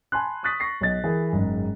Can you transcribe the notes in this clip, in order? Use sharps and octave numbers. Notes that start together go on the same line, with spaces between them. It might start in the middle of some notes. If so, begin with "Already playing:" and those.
G#5 A5 B5 C6 F#6
C#6 D#6 F#6 A6 B6
C#6 A#6 C7
B1 D#5 A6
E3 G#4 A#4 G#5
F#1 G#2